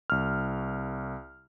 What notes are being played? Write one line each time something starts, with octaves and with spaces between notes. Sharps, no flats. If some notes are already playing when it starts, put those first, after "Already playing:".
C2 F6